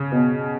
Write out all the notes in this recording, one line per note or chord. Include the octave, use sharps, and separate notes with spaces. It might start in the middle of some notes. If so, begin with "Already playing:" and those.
Already playing: C#3
B2